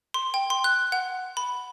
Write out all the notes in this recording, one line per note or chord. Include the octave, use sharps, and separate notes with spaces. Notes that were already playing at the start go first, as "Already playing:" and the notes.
C6
G5
C6
F#6
F#5
B5